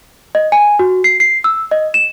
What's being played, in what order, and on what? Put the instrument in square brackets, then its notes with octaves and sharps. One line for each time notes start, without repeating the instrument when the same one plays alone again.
[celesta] D#5
G#5
F#4
C7
C7
E6
D#5
E7